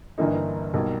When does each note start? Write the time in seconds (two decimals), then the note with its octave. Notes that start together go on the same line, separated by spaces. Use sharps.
0.18 G1 G2 E3 A#3 D#4
0.74 B1 B2 G3 A#3